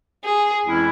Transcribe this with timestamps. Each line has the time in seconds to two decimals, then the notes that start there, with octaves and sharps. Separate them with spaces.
0.24 G#4
0.66 F2 E3 G#3 C#4 E4